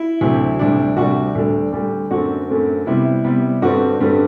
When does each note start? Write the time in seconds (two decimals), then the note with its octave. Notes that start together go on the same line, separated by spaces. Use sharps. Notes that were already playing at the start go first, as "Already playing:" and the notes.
Already playing: E4
0.21 D2 C3 F#3 C4
0.59 D2 C3 G3 D4
0.97 D2 C3 G3 D4 F#4
1.35 D2 D3 G3 D4
1.73 D2 D3 G3 D4
2.11 F#2 D3 A3 C4 F#4
2.48 F#2 D3 A3 C4
2.86 C3 G3 B3 E4
3.24 C3 G3 B3
3.62 G2 D3 G3 C4 F#4
4.00 G2 D3 G3 C4